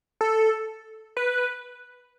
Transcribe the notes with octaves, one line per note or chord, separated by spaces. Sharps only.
A4
B4